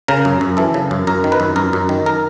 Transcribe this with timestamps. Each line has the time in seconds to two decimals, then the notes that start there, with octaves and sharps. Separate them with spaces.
0.08 C#3 A#4
0.25 F#2
0.41 F#2
0.57 E3 A4
0.74 C#3
0.91 F#2
1.07 F#2 A#4
1.24 D#3
1.32 B4
1.40 F#2
1.56 F#2 A#4
1.73 F#2
1.89 D#3
2.06 A#4